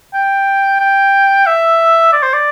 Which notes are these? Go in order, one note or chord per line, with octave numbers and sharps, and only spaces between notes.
G5
G5
E5
D5
C5
D5